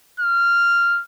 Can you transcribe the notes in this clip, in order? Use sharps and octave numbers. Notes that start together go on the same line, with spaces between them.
F6